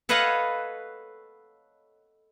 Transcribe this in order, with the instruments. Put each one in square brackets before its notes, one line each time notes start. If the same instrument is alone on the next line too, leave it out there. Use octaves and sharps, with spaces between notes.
[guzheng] A4 B4 C#5 D#5 F5 F#5